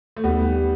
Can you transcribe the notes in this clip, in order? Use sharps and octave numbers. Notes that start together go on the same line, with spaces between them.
A3
D#2 G3 B3